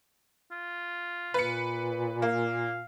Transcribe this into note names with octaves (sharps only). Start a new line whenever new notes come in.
F4
A#2 B4 C#7
A#3 F5